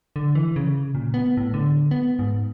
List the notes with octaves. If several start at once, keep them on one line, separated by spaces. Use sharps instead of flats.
D3
E3
C#3
A#2
B3
A2
D3
B3
G#2